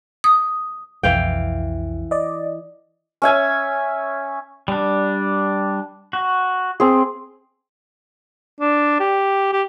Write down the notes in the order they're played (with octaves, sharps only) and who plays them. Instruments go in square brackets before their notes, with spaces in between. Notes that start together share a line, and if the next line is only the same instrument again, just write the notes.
[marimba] D#6
[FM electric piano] B1 F2 [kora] E3 F5 G5
[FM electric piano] D5 D#5
[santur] C#4 E5 G#5
[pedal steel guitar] G3 D4
F#4
[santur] C4 G#4
[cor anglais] D4
G4
G4